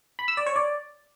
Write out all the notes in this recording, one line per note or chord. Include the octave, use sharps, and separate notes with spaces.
B5
E6
D5
C#5
D5